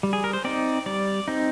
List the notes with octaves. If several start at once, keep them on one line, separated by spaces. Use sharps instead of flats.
G3
G#4
A#4
C5
C4 D#4 D5
G3 D5
C4 D#4